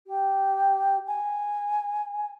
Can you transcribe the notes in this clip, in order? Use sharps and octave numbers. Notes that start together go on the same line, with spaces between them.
G4
G#5